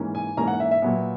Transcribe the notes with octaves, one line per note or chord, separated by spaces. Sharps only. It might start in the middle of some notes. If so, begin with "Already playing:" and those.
Already playing: G#2 E3 A#3 C#4
G#5
G#2 E3 A#3 C#4 A#5
F#5
E5
E5
A#2 F#3 B3